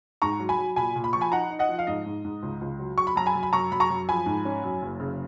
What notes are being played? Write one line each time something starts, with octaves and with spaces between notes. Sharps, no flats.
G#2 A#5 C#6
F#3
G#5 B5
F#3
A#2 G#5 B5
A#2
B5
F3 C#6
G#5 B5
D#4 F#5 A#5
D#4
D#5 F#5
F3
F5
G#2 D#5
G#2
G#2
C#2
C#2
F#3
F#3 C#6
B5
F#2 A#5
G#5 B5
F#2
B5
F#2 A#5 C#6
F#2 B5
A#5 C#6
F#2
F3 G#5 B5
G#2
C#4
F#2
F#1
C#3